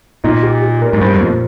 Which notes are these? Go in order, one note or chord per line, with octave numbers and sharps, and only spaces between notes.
A#2 D#4
G4
G4
A#4
G#2
G2 C4
F2
A#2